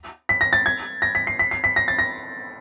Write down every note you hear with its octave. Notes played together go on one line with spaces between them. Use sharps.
B6
A#6
A6
G#6
A#6
B6
C7
B6
C7
B6
A#6
A6
A#6